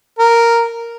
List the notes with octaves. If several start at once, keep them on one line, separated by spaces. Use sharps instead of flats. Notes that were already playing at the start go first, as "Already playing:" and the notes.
A#4